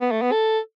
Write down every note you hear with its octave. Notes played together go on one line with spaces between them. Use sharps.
B3
A3
B3
A4